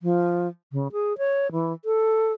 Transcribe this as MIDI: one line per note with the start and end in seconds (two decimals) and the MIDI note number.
0.02 0.48 53
0.72 0.88 49
0.92 1.16 68
1.18 1.51 73
1.52 1.73 52
1.85 2.33 69